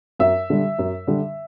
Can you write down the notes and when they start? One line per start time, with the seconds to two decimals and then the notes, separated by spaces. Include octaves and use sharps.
0.19 F#2 E5
0.50 D3 G3
0.79 F#2
1.07 D3 G3